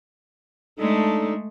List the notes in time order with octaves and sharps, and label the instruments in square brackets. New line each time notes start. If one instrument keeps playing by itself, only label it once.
[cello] G#3 A3 [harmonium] D4 D#4 A4